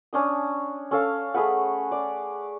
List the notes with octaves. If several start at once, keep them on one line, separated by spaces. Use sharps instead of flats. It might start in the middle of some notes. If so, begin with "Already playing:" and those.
C#4 D4 D#6
C#4 A4 F5
A3 G#4 B4 F#5
D5